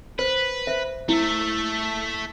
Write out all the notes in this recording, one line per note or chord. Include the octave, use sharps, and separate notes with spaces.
B4 C5
C5 E5
A3 E4 A4